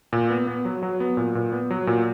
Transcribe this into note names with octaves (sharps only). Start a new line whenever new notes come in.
A#2
B3
B3
F#3
F#3
B3
A#2
A#2
B3
F#3
A#2